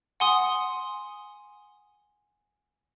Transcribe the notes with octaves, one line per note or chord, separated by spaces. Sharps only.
F#5 G#5 C6 D#6